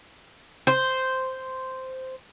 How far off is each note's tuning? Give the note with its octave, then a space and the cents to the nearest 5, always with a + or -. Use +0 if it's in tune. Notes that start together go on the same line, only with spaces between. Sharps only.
C5 -5